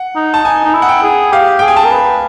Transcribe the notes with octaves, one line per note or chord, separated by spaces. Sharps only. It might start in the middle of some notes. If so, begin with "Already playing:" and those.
Already playing: F#5
D#4
A5
D#4 G#5
D#4
E4
F#5
G5
G#4
G4 F5
G#4 G5
G#5
A5
A#4
B4